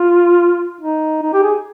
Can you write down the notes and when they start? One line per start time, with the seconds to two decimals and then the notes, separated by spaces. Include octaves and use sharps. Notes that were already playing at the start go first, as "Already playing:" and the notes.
Already playing: F4
0.81 D#4
1.23 D#4
1.33 G4
1.43 G#4